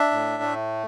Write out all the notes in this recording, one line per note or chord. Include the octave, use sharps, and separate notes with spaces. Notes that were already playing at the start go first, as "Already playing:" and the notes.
Already playing: D4 E5
A2
A3